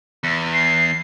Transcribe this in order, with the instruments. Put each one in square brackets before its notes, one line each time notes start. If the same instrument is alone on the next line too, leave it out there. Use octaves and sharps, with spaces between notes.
[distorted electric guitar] E2
[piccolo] C7